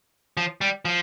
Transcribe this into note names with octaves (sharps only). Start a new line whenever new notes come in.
F3
G3
F3